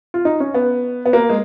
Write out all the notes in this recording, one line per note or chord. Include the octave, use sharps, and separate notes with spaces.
F4
D#4
C#4
B3
B3
A#3
G#3